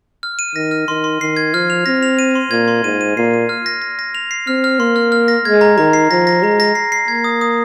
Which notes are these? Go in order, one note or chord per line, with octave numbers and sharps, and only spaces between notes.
F6
D#7
D#3 A#6
F6
D#3 C6
C6
D#3 C7
G#6
F3 F6
F7
C4 A#6
F7
D#7
C6
A#2 G#6
C6
G#2 D#7
D#7
A#2 C7
D#7
F6
A#6
A#6
A#6
F7
C7
C4 F6
F6
A#3 C6
F6
F6
A#6
G#3 G#6
A#5
D#3 A#5
C7
F3 A#6
A#6
G#3 A#5
A#6
C7
C7
A#3 G#6
D#6
D#6